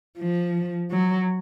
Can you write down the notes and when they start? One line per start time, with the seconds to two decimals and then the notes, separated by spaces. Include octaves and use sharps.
0.18 F3
0.91 F#3